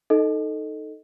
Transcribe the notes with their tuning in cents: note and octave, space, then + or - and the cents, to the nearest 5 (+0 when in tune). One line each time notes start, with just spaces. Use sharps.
D#4 +0 A4 +0 D#5 +0